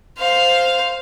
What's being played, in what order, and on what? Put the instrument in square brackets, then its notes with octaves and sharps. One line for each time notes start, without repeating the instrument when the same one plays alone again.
[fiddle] C5 F5